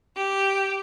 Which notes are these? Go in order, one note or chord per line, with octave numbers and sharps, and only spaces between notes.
G4